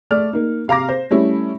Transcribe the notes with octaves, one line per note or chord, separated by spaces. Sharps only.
A3 D5 F6
A#3 D#4
C3 F5 A#5 D6 A#6
C5
G3 A3 C#4 E4